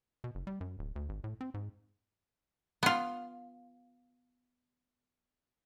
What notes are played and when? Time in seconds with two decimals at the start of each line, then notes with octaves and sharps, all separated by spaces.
0.24 B2
0.35 F#1
0.47 G3
0.61 F#2
0.79 D1
0.96 D2
1.09 G#1
1.24 A2
1.41 C4
1.54 G#2
2.83 B3 F4